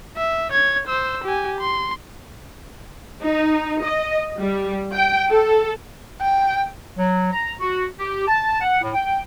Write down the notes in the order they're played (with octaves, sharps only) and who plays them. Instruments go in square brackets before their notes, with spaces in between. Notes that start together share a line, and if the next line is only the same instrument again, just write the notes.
[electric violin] E5
C#5 G#6
C5 E6
G4 G#5
C6
[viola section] D#4
D#5
G3
G5
A4
[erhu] G5
[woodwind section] F#3
A#5
F#4
G4
A5
F#5
A2
G5